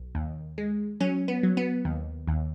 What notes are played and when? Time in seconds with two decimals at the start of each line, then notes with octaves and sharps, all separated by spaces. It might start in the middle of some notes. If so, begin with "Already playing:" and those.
Already playing: B1
0.15 D#2
0.58 G#3
1.00 F#3 C#4
1.28 B3
1.43 F#3
1.57 B3
1.85 D#2
2.28 D#2